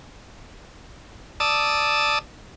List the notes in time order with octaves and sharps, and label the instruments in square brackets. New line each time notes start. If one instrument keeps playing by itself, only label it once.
[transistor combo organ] D5 A5 D#6 E6